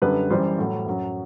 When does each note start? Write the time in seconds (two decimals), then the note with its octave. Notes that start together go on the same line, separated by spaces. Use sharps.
0.02 F#2 D3 G3 B4
0.31 F#2 E3 G3 C5
0.59 A2 F#3
0.86 F#2 F#3